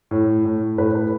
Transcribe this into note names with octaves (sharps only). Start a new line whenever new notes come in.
A2
A2
A2 B4
B4